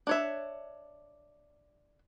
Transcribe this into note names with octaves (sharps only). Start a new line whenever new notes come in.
D4 C#5 E5